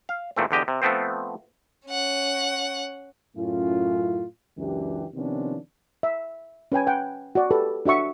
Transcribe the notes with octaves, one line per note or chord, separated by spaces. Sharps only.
F5
E2 A#2 A3 C4
E2 D3 G4 D#5
C3
F3 A3 B3 C4 C5
C#4 F#5
F#2 A2 C#4 E4 F4
C#2 F#2 E3 D4 G4
C3 D#3 F3 B3 C#4 D4
E5
C#4 B4 G5 G#5
B4 F#5 G5
F#4 D5
F#4 G4 A4 B4
D4 F#4 E5 C#6